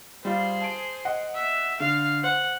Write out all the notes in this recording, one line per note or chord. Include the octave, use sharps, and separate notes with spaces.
G3 F4 G#4 C5
A5 D7
D#5 F#5
E5
D3 F5
C5 F#5